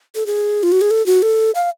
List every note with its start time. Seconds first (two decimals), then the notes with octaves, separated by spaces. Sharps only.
0.15 A4
0.26 G#4
0.63 F4
0.72 F#4
0.81 G#4
0.91 A4
1.06 F#4
1.22 A4
1.55 F5